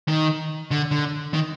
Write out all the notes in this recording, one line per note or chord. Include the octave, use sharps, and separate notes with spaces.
D#3
D3
D3
D#3